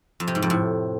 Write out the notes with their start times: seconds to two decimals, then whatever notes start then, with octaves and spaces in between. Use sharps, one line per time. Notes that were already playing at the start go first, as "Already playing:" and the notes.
0.20 F2
0.28 C3
0.35 G#2
0.42 F2
0.50 A2